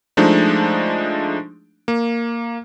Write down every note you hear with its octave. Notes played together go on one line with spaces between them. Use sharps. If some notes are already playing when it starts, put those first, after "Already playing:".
F3 G#3 A3 D4 D#4
A#3